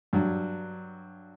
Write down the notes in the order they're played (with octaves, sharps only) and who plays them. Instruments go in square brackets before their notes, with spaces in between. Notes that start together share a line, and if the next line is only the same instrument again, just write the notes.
[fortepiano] G2 F#3